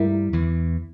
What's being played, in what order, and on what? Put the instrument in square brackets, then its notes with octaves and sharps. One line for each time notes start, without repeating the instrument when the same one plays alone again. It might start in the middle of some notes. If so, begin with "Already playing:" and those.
Already playing: [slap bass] G2 G3 [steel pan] E4 A#4 E5
[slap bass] E2 E3